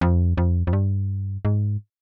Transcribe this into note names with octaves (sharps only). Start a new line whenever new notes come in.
F2
F2
F2
G2
G#2